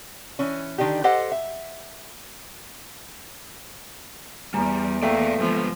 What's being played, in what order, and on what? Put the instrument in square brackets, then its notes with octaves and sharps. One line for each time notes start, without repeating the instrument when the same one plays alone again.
[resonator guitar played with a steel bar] E3 C#4
D3 D#3 D4 D#4 G4
G4 A4 C5 D#5 F#5
E5
[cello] E2 [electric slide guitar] G3 [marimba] G#5 A#5
[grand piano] A3 [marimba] A#3 G5 [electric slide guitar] D5 F5
[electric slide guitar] G2 B3 [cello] F3 [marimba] G#3